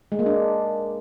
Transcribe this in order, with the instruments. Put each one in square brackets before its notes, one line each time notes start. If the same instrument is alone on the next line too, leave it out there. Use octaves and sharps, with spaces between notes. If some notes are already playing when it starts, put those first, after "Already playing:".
[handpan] G#3
A#3
D4